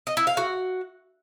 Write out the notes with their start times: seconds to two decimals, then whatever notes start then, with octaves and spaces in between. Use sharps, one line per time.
0.07 D#5
0.17 E4
0.27 F5
0.37 F#4